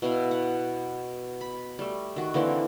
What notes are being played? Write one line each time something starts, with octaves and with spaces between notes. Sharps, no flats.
B2 E4 F5
F#5
B5
G3 A3
D#3 F#4
D3 E3 A#3 C4